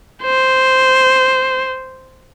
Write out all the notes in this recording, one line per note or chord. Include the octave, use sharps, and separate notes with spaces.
C5